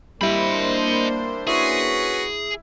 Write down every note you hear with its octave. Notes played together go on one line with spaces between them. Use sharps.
G3 A#3 D4 E4 C5 D#5 B5
C#4 E4 F#4 G#4 B4